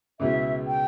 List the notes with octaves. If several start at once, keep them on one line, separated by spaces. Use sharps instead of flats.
C#2 B2 G#3 B3 E4 E5
G5